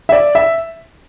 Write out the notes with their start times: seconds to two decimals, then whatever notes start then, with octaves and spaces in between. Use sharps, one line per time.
0.09 E5
0.12 D5
0.35 E5